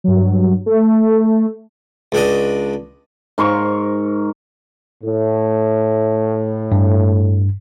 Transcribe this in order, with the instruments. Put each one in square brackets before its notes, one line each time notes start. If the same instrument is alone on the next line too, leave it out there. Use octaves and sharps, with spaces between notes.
[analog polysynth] G2 F#3
A3
[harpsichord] C#2 D4 D#5
[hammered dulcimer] G#2 A#4 C6 C#6
[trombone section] A2
[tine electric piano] G2